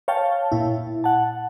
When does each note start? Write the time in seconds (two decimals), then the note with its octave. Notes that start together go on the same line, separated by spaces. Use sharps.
0.08 C#5 F5 G5 A5
0.52 A#2 E4
1.04 F#5 A5